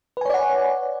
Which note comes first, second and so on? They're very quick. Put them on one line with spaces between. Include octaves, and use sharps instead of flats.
B4 G#5 C#5 D5 F#5